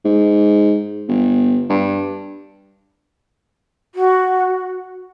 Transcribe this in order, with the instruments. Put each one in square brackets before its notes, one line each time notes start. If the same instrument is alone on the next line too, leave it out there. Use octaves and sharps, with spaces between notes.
[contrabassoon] G#2
G1
G2
[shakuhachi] F#4